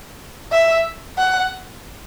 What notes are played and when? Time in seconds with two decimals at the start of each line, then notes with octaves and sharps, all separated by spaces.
0.52 E5
1.18 F#5